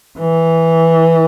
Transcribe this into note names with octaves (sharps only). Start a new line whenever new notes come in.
E3